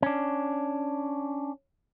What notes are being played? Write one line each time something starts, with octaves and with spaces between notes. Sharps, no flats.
C#4 D4